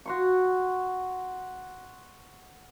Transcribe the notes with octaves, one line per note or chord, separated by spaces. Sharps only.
F#4 C6 C#6